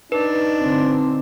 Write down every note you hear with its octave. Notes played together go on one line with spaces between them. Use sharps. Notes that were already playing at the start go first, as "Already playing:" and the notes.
D4 D#4 B4
D3 C4